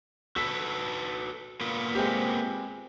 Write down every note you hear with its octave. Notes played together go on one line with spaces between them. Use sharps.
F#4 A4 B4 E6 B6
A#3 B3 F4
G#3 C4 G4